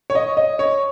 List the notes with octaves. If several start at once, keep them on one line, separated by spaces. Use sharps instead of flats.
C#5
D#5
D#5
C#5